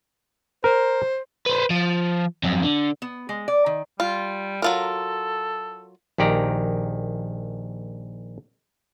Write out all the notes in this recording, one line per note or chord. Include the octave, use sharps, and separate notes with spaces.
A#4 C5
B4 C5
F3
F2 F#3
D3
B3
G#3
D5
D#3
G3 F4
F#3 F4 A4 A#4
A#1 D#3 G4 D5 A#5